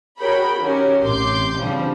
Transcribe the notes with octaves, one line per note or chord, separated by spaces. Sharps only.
F#4 G#4 A#4 C#5 G5 B5
D#3 F#3 C#4 G4 A#4
A1 C3 C6 D6 G6
C#3 E3 F3 G3 C4 D4